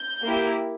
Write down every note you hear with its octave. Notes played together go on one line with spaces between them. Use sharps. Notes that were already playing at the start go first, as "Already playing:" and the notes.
Already playing: G6
A#3 E4 G4